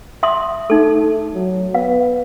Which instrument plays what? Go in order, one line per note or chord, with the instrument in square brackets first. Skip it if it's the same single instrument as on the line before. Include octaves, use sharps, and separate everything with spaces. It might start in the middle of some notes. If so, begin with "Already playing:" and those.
[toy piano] E5 C6 D#6
[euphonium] A3 [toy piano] D#4 A4
[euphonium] F#3
[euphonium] B3 [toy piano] F5